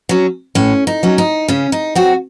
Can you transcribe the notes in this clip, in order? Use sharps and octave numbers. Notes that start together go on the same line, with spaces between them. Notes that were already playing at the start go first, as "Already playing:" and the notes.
F#3 C#4
A2 C#4
D#4
F#3 C#4
D#4
C#3 C#4
D#4
F#3 C4 F#4